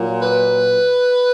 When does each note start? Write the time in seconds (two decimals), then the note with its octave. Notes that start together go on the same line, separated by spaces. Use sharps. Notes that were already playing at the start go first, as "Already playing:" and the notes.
Already playing: A#2 F#3
0.22 B4